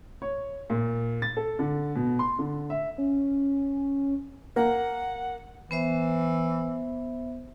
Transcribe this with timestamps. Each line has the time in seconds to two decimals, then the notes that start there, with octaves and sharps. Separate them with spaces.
0.22 C#5
0.70 A#2
1.22 A6
1.37 A4
1.59 D3
1.96 B2
2.19 C6
2.39 D3
2.70 E5
2.98 C#4
4.56 A#3 F#5
5.71 E3 B3 C5 E5